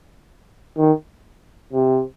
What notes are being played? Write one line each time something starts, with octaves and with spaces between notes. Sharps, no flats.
D#3
C3